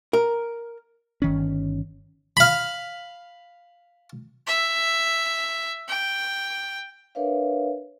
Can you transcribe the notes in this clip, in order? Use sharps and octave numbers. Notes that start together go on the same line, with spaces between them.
A#4
G1 D#3 C#4
F5 B5
E5
G5
D4 A#4 B4 C#5 E5 F5